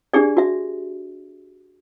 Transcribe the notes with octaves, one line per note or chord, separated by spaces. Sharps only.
D4 G4 G#4 D5
F#4 E5